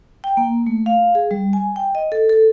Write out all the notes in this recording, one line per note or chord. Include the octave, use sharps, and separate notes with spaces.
G5
A#3
A3
F5
G#4
G3
G#5
G5
D#5
A4
A4